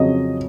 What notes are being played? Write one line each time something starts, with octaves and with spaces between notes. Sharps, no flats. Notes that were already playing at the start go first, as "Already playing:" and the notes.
Already playing: F2 C#3 F#3 D#5